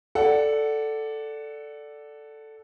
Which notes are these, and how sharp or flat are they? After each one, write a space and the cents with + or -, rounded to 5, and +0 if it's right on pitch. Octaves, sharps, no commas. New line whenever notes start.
A4 +0 D5 +0 F#5 +10